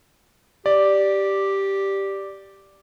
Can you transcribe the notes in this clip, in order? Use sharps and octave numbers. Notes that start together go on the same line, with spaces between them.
G4 D5